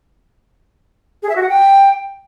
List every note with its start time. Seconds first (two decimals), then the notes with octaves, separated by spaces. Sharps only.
1.23 G#4
1.29 E5
1.36 F#4
1.42 F#5
1.49 G5